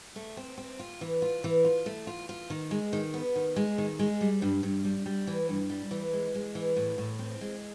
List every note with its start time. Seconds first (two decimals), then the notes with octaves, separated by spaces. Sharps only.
0.16 A3
0.37 C4
0.58 C4
0.80 F4
1.01 E3
1.22 F4
1.44 E3
1.65 F4
1.86 A3
2.07 F4
2.29 F4
2.50 D#3
2.71 G#3
2.93 D#3
3.14 B3
3.36 D#3
3.56 G#3
3.78 D#3
3.99 G#3
4.21 G3
4.42 G2
4.63 G2
4.85 G3
5.06 G3
5.27 E3
5.49 G2
5.70 G3
5.91 E3
6.13 G#3
6.35 G#3
6.55 E3
6.76 A2
6.98 A2
7.19 C4
7.41 G#3